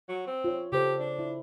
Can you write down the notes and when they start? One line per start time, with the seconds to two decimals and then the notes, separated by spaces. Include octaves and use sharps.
0.09 F#3
0.27 C4
0.44 F4 C#5
0.72 C#3 G4 A4 C5
0.99 D4
1.19 E4